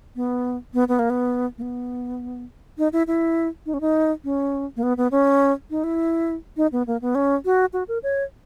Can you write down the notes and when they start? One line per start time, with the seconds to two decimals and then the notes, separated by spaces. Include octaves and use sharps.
0.16 B3
0.74 B3
0.88 B3
0.99 A#3
1.10 B3
1.58 A#3
1.62 B3
2.78 D#4
2.93 E4
3.07 E4
3.66 D#4
3.74 C#4
3.81 D#4
4.24 C#4
4.76 A#3
4.83 B3
4.97 B3
5.11 C#4
5.70 D#4
5.84 E4
6.57 D#4
6.72 B3
6.87 A#3
7.02 B3
7.15 C#4
7.45 F#4
7.73 F#4
7.88 A#4
8.03 C#5